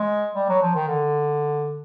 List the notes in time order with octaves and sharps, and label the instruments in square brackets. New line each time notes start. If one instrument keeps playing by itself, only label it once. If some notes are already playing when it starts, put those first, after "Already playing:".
Already playing: [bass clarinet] G#3
G3
F#3
F3
D#3
D3